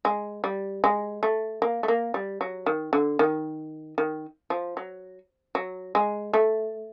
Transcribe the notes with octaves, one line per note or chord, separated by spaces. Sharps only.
G#3
G3
G#3
A3
A#3
A3
A#3
G3
F#3
D#3
D3
D#3
D#3
F3
F#3
F#3
G#3
A3